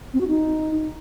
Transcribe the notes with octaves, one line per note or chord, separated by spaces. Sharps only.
C4
F#4
D#4